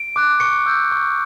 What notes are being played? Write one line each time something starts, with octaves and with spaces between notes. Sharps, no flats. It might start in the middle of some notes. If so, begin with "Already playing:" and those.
Already playing: D7
D6 F#6
C#6 C#7
E6 G6
C#6